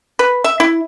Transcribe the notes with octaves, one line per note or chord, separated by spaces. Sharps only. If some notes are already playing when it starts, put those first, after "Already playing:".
B4
E5
E4